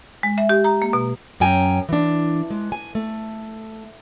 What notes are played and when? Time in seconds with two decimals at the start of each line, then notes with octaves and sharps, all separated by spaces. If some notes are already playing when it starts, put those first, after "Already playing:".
0.23 G#3
0.38 E5
0.49 G4
0.64 A#5
0.82 A#3
0.93 B2
1.40 F#2 C#4 G5 G#5 A#5
1.89 E3 D4
2.50 G#3
2.72 G#5
2.95 A3